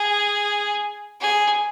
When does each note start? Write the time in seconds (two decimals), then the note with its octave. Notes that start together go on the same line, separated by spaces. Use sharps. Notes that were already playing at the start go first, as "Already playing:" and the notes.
Already playing: G#4
1.21 G#4